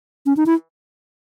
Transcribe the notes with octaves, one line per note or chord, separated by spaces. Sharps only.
C#4
D#4
E4